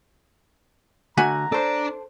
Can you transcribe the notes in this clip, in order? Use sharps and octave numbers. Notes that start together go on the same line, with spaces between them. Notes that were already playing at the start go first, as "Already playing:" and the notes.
D3 A3 F#4 E5 F#5 G#5 A#5
D4 A4 C5 D5